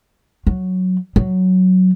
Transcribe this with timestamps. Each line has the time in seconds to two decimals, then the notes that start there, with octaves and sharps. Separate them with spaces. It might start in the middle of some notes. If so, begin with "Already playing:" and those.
0.47 F#3
1.16 F#3